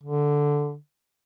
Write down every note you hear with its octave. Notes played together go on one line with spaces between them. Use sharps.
D3